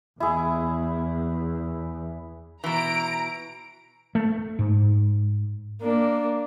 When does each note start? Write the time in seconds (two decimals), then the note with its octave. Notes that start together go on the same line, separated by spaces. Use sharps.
0.20 E2 E4 G#4
2.64 B2 E3 A#5 D7
4.15 A3
4.59 G#2
5.82 A#3 D4